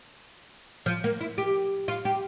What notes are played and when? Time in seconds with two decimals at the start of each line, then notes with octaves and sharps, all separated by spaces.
0.86 F3
1.04 A#3
1.21 E4
1.38 G4
1.88 F4
2.05 G4